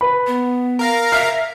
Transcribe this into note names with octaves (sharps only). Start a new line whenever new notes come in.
B4 B5
B3
A#4 F5 A#5
E5 F6 C7